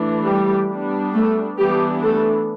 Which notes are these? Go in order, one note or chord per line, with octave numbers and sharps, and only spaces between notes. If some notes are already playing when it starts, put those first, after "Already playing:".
Already playing: E3 A3 D4
G3 G4
G3 B3 D4
A3 A4
E3 G3 B3 D4 G4
A3 A4